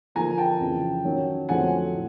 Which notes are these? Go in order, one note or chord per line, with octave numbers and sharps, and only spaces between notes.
D3 F3 A#3 D4 G#5 A#5
G5 A5
F2 C#3 E3
D#3 F#3 A#3 C#4
F2 D3 F#3 A3 C4 F#5 G#5
A2